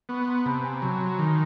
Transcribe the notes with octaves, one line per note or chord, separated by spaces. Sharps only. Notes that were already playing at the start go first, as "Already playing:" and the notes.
B3 B5 C#6
A#5 C6
C3 A5 B5
G#5 A#5
A#5
F#3 A5 B5
A#5 C6
D#3
G#5